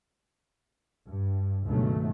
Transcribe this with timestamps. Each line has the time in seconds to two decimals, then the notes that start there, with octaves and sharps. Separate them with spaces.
1.07 G2
1.66 C#2 G2 B2 D#3 F#3 A3